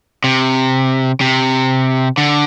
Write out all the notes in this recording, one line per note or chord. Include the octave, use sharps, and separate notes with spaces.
C3
C3
D3